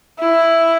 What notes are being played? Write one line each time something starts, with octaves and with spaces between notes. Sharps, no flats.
E4